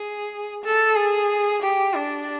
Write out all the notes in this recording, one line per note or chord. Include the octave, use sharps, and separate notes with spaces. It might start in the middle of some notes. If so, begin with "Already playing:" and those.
Already playing: G#4
A4
G#4
G4
D4